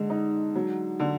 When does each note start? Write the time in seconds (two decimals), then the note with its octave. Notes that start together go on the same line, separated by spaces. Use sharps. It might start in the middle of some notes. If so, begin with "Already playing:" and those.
Already playing: D3 G#3
0.10 D#4
0.55 F#3
1.00 D3